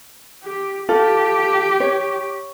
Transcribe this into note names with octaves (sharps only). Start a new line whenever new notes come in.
G4
F4 G4 A4
C#5